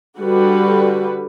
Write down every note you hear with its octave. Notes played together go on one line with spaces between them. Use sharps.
D3 G3 F#4 B4